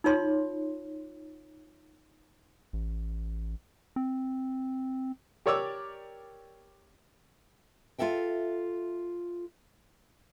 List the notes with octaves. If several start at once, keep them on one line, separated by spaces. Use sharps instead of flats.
D#4 F4 C#5 C6
A1
C4
G4 A#4 C#5 D5 D6 E6
F4 G4 A4 E5 G5